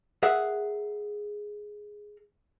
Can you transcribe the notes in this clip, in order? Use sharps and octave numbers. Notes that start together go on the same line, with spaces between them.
G#4 A#4 E5 F#5